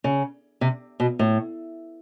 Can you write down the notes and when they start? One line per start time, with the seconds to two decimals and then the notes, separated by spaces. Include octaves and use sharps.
0.04 C#3
0.61 C3
1.00 B2
1.19 A2